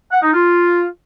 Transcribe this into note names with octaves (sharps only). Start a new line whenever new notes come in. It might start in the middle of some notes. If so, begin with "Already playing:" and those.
F#5
D#4
F4